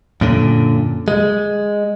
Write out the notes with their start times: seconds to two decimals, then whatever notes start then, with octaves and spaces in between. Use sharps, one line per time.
0.21 F#2 A#2 D3
1.08 G#3